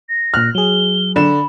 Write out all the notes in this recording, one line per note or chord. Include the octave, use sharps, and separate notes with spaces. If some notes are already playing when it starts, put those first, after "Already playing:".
A#6
A#2 F6 F#6
F#3 G#4 G7
D3 B5 E7